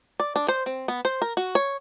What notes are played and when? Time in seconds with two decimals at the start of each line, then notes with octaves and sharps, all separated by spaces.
0.20 D5
0.36 D4
0.48 C5
0.66 C4
0.88 B3
1.05 C5
1.22 A#4
1.37 F#4
1.55 C#5